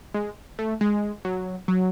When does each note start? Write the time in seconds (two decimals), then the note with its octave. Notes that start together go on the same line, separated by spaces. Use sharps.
0.14 G#3
0.59 A3
0.81 G#3
1.25 F#3
1.68 F#3